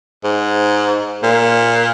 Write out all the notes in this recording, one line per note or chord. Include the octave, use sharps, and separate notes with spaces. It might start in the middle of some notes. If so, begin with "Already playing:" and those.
G#2
A#2